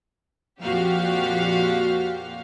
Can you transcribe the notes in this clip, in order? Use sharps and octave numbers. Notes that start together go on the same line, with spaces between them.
F2 A#2 F3 F#4 G4 F5